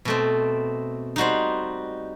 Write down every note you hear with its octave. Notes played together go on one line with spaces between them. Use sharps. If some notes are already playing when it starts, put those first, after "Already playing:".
B2 A3 C4
G3 D#4 F#4 C5